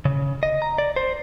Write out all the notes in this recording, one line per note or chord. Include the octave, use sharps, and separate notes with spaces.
C#3
D#5
A#5
D5
C5